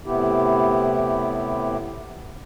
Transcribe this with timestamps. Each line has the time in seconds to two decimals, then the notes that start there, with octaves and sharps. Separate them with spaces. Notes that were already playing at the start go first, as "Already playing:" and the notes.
0.06 A2 C3 B3 E4 G4